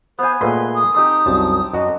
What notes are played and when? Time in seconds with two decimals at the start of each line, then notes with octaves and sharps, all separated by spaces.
0.19 B3 C5 G#5
0.41 A#2 G#3 A3 B4 C6
0.75 D#6
0.94 C4 D#4 G4 A4
1.26 C2 F#2 A5
1.74 F#2 F#4 D#5